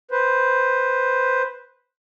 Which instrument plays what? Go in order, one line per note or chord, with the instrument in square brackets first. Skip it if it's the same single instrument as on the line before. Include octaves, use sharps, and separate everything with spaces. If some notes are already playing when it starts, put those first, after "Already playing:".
[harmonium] B4 C5